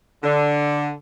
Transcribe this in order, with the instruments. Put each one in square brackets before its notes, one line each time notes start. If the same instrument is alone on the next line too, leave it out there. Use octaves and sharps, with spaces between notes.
[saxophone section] D3